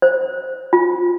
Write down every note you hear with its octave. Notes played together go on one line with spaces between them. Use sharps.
C5
F4